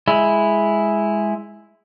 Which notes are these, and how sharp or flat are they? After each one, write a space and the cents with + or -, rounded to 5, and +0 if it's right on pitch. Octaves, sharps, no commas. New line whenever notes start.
G#3 +0 E4 +0